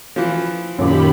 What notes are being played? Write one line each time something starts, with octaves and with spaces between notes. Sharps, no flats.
E3 F3
F#2 A#2 D#3 G4 B5 D6